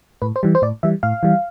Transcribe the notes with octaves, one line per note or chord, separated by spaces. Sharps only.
A2 B4
C5
E3 G3
C5
A2 D5
E3 G3 E5
A2 F5
E3 G3